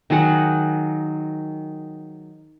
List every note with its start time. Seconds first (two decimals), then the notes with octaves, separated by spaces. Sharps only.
0.10 D#3 F#3 G#4 F#5